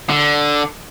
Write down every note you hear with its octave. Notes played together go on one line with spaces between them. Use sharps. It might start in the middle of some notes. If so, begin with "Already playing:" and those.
D3